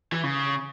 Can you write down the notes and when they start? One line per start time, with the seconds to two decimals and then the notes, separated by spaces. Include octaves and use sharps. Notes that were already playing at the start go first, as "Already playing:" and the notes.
0.13 E3
0.23 C#3